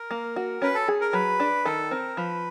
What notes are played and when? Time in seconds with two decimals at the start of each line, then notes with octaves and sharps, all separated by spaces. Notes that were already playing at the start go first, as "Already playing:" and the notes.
Already playing: A#4
0.11 A#3
0.36 F#4
0.62 C#4 B4
0.75 A4
0.88 G#4
1.01 A#4
1.13 F#3 B4
1.40 D4
1.65 D#3 A4
1.91 C4 A#4
2.17 F3 B4